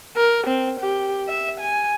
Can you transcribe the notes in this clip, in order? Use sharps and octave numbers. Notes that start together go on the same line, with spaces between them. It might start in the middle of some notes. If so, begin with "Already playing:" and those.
A#4
C4
G4
E5
G#5